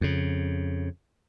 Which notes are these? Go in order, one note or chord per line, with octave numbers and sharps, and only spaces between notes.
F2 C#3